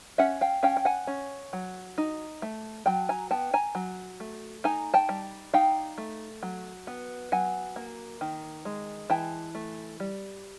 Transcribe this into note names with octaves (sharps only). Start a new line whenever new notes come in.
C#4 E5 F#5
F5 G5
C#4 F5 G5
G5
F#5 G#5
C#4
F#3
D#4
A3
F#3 G5 A5
G#5 A#5
B3 G5 A5
G#5 A#5
F#3
A3
D#4 G#5 A#5
G5 A5
G3
D#4 F5 G5
A3
F#3
B3
F#3 F#5 G#5
A#3
D#3
G#3
E3 G5 A5
A3
G3